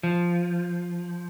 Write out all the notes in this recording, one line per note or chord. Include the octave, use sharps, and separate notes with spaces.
F3